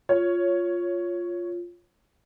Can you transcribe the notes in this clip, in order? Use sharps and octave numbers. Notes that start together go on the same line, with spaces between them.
F4 C#5